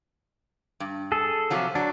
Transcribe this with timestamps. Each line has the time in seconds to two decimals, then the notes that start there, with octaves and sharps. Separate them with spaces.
0.80 G2
1.12 G#4 A4
1.50 C3 F3 F#3
1.75 F#3 D4